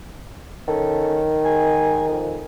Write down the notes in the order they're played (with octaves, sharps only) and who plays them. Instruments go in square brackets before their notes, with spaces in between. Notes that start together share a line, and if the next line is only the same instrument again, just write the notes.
[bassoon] D#3 [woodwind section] C#4 A4
[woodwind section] D#2 G#3 G#5
F2